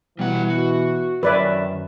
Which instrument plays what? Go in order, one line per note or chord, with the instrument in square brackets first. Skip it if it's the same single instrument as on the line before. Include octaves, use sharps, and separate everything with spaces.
[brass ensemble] B2 E3 [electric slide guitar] G3 F#5
[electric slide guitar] F#4
[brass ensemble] F#2 [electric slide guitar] D#3 [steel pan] B4 D5 E5